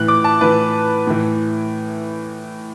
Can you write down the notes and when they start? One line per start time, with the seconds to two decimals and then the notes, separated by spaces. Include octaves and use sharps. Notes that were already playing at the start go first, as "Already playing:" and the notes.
Already playing: A2 E3 F#6
0.08 D6
0.24 A5
0.41 A2 E3 B4
1.07 A2 E3